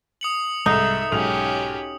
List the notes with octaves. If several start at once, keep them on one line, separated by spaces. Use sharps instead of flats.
D#6 C#7 F#7
C2 G#2 D#4 A4 E5
B1 G#2 C#4 G4 F7